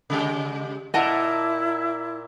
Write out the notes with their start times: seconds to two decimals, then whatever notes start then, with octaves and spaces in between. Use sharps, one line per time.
0.10 C#3 G#3 G4
0.94 A#2 E4 A#4 D#5 F#5 A5